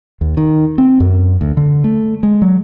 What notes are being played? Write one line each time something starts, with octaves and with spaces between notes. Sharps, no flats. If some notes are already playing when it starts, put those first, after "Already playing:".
D#2
D#3
C4
F#2
D2
D3
A3
G#3
F#3